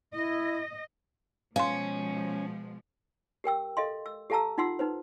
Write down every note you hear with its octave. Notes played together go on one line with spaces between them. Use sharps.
E4 D#5
B2 F3 G#3 C#4 F5 C6
G4 A#4 G5 E6
A4 D#5 F5 C6
E6
G4 A4 F5 A5 A#5 E6
D#4 F4 F#5 C6 E6
D#4 B4 C5